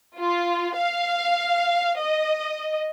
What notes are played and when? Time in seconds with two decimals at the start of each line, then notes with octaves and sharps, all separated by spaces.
0.19 F4
0.76 F5
2.00 D#5